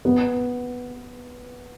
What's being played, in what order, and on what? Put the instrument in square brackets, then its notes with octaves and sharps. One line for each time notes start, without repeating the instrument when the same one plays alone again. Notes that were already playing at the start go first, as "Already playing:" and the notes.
[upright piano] B3